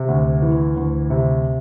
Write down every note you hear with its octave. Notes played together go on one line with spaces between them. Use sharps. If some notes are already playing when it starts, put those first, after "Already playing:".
Already playing: C3
D2
E3
D2
C3